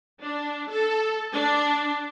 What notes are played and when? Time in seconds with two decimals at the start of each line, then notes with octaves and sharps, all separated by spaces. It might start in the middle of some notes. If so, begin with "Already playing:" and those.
0.21 D4
0.69 A4
1.33 D4